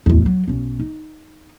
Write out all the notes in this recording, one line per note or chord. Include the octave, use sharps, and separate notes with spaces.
D1 E2
F#3
B1 C#4
D#4